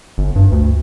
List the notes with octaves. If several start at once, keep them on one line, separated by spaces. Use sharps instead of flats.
G1
G2
D2